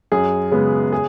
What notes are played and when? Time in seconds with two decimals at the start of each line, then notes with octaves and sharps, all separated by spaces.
0.12 F#2 G#4
0.51 C#3 G#3 B3
0.92 G#4